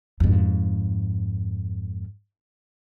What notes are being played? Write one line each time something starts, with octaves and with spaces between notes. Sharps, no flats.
F2 G#2